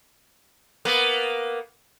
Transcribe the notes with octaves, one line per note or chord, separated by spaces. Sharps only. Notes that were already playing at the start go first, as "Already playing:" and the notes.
A#3 B3